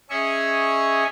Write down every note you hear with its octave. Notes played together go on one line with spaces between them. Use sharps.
C#4 G#4 D#5 E5 C#6